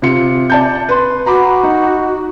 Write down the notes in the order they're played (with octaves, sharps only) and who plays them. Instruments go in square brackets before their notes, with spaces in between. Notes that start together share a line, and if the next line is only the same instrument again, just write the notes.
[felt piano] C3 F4 C#7
D5 A5 G6
B4 C6
[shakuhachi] F#4 [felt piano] A#5 B5 D6
[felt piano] D#4